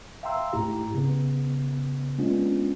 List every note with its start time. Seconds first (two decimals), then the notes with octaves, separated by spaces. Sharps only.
0.23 E5 F5 G5 A#5 C6 E6
0.53 D#2 G#2 A3 E4 G4 A#5
0.94 C#3 B3
2.18 G#3 A#3 B3 C#4 D4 F4